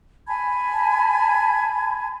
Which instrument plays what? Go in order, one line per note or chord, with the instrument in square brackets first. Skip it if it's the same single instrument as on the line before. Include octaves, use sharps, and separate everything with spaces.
[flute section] G#5 A5 B5 G#6